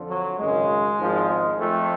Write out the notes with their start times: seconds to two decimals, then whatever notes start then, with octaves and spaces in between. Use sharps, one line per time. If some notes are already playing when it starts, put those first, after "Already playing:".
Already playing: F2 D3 F3
0.09 F#3
0.39 G#1 F#2 C#3 G#3
0.99 G#1 G#2 F3
1.59 F2 F3 A3